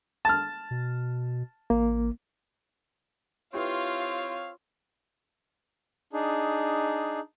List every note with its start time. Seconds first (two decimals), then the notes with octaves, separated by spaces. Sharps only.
0.25 A5 F6
0.71 B2
1.70 A1 A#3
3.54 C4 E4 F4 G4 B4 C#5 F5
6.13 D4 D#4 G#4